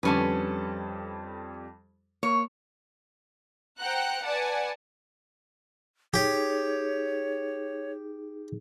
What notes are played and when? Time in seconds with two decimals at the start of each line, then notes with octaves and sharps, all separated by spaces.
0.03 F2 D3 G3 C#4 B4 A5
2.23 A#3 C#5
3.79 C5 F#5 G5 A#5 F#6
4.22 B4 D5 F#5 G#5 A5
6.14 D#4 G4 G#4 C#5